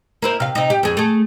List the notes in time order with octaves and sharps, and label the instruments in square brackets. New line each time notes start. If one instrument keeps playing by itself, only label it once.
[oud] A#3 E4 C5
C3 F5
C3 D#4
G4
F2 G#4
A3 G#4